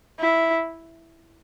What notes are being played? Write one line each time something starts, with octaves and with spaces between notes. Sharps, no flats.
E4